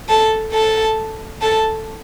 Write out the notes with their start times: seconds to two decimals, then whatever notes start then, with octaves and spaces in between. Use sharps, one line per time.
0.09 A4 A5
0.53 A4 A5
1.41 A4 A5